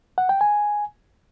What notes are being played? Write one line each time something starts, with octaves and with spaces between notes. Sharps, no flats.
F#5
G5
G#5